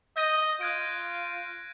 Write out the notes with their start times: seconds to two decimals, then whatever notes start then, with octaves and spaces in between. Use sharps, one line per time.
0.17 D#5 G6 A#6 D#7
0.61 F4 F#6 G#6 D7